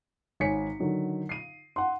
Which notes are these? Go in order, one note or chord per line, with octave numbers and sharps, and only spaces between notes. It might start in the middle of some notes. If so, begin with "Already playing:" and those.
G#1 C#5 G#5 B6 C#7
D3 D#3 F#3
C7 D#7
F#5 C6